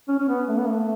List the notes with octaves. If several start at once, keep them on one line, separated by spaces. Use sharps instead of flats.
C#4
C#4
B3
A3
B3
A3